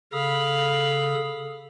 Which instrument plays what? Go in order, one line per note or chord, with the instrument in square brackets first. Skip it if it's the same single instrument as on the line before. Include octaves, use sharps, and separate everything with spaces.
[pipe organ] C#3 A4 D#6 [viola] F5 B5